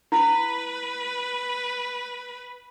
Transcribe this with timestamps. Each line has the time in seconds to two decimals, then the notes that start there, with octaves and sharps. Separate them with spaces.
0.12 E4 B4